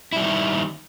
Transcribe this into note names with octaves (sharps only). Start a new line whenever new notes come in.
D#3 G3 E4